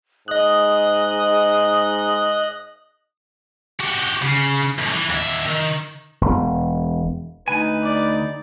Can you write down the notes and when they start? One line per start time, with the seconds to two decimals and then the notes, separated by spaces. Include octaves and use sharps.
0.28 G#2 D#5 D#6 F#6
3.80 F#4 G4
4.22 C#3
4.79 E2 A2
4.92 E3
5.10 D#2 E5
5.47 D#3
6.21 E1
7.48 D2 D#4 B4 G#5
7.83 D5